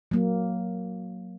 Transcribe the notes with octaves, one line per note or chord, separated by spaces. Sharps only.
F#3 A#3